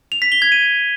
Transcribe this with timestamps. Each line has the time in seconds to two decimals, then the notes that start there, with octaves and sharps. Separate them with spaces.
0.12 F7
0.22 B6
0.32 G7
0.42 G#6
0.52 D#7